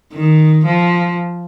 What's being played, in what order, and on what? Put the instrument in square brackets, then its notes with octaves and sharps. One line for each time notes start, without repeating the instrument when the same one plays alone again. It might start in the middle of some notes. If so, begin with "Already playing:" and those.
[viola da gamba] D#3
F3